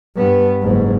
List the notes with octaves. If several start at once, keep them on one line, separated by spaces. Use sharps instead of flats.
G2 B3
F#1 G#2